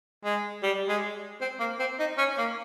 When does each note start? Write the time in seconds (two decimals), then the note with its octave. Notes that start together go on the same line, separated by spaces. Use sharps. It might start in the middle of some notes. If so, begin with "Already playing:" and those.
0.24 G#3
0.63 G3
0.89 G#3
1.41 C4
1.59 A#3
1.79 C4
1.99 D#4
2.18 C#4
2.38 A#3